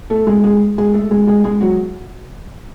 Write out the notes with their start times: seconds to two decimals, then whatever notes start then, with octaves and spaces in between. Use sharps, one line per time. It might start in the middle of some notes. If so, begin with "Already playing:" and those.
0.10 A3 A4
0.27 G#3 G#4
0.44 G#3 G#4
0.78 G#3 G#4
0.94 A3 A4
1.11 G#3 G#4
1.27 G#3 G#4
1.44 G#3 G#4
1.60 F#3 F#4